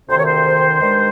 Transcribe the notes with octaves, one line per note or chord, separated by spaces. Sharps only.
D2 C3 D#3 C5
C#5
C5
G2 D#3 G#3